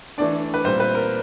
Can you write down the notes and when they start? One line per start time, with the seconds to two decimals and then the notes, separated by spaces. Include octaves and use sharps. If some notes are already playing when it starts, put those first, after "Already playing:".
0.18 E3 A3 D4 D5
0.54 B4
0.64 A#2 G3 C4 C5
0.80 B4
0.95 A#4